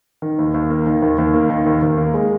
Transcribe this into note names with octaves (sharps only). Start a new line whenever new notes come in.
D#3
D#2
D#2
A#3
D#3
D#2
D#2
A#3
D#3
D#2
D#2
A#3
G#3